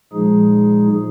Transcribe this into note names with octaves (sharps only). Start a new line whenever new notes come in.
A#2 F3 G#3 D#4 G#4